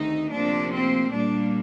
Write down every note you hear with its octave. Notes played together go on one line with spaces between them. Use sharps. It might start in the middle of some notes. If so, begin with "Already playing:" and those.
Already playing: D2 C3 D#3 A3 D#4
D2 C3 F3 A#3 D4
C4
A#2 G3 A#3 D4